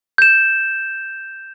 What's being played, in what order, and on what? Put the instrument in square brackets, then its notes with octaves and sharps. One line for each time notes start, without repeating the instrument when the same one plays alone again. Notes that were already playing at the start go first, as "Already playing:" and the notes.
[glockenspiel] G6 E7